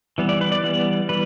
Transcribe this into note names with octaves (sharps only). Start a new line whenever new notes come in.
E3 G3 B3
D5
B4
D5
E3 G3 B3
E3 G3 B4